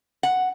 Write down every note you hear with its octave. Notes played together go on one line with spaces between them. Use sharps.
F#5